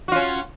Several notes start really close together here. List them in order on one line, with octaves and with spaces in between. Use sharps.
F#4 F4 C#4